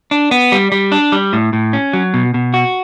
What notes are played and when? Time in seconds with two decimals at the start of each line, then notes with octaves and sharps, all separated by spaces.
0.11 D4
0.31 B3
0.52 G3
0.72 G3
0.92 D4
1.12 G3
1.33 A2
1.53 A2
1.73 C#4
1.93 F#3
2.14 B2
2.34 B2
2.54 F#4